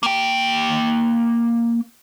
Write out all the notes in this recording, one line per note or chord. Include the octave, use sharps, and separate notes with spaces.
A#3 G5